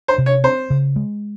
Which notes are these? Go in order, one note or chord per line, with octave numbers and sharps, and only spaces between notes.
C5
C3
C#5
C4 C5
C#3
G#3